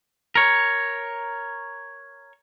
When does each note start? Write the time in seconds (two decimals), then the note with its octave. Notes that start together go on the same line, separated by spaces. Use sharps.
0.36 A#4 C#5